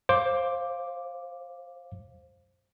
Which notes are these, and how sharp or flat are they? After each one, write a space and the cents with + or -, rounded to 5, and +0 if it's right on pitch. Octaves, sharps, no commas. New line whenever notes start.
C5 +15 F5 +0 D6 +0